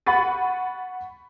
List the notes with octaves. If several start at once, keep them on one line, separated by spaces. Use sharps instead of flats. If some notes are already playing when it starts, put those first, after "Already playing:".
F#5 B5 C#6 A6 D#7